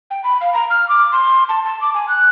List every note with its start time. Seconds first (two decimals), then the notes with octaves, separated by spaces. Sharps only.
0.11 G5
0.24 B5
0.41 F5
0.54 A#5
0.70 F6
0.89 D6
1.12 C6
1.49 A5
1.65 A5
1.81 D6
1.94 G#5
2.08 F#6